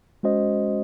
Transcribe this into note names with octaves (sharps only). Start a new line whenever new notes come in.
G#3 C#4 F#4 C5 D#5